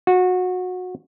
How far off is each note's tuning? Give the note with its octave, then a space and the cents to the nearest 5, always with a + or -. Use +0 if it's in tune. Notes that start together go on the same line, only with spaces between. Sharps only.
F#4 -20